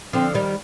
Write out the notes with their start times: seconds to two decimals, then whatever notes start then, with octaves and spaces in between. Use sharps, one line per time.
0.13 D3 F3 C4
0.34 D#3 G3